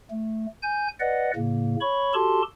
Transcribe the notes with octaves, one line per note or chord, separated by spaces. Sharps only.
A3
G#5 G6
B4 D5 D#5 F#5
A2 C#3 A#3
C#5 B5 C#6
F#4 G4 A4 A5 C6